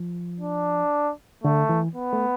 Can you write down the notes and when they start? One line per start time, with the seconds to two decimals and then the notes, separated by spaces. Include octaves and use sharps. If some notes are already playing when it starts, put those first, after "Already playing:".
Already playing: F3
0.40 D4
1.44 D3 A3
1.69 E3
1.96 B3
2.13 A3